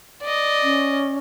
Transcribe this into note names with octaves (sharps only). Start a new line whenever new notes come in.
D5 D#5
C#4